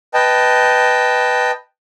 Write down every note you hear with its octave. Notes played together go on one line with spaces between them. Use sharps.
B4 D#5 G5 A5